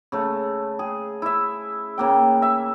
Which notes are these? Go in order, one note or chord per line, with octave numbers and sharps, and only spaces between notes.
C#3 A3
G#4
E4 E5
C#3 A#3 G5
E5